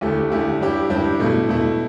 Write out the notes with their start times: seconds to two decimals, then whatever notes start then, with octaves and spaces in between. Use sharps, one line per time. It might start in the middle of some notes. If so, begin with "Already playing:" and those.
0.01 D2 D3 A3 E4 G4
0.30 D2 D3 A3 E4 G4
0.60 G2 G3 E4 G4
0.90 G2 G3 E4 G4
1.20 B2 A3 E4
1.48 B2 A3 E4